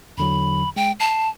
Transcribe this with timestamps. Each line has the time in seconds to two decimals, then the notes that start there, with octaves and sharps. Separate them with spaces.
0.18 E2 D3 F#3 B5
0.76 G#3 G5
1.00 A5 C7